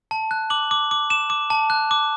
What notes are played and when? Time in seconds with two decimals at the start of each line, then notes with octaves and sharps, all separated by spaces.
0.11 A5
0.31 F#6
0.50 D6 F#7
0.71 D6
0.91 D6
1.10 D6 E7
1.30 D6
1.50 A5
1.70 F#6
1.91 D6